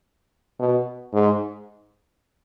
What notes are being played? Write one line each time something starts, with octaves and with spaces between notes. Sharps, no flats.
B2
G#2